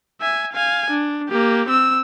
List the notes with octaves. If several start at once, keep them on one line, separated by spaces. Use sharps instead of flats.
E5 G#5
F5 G#5
D4
A#3 G4
C4 E6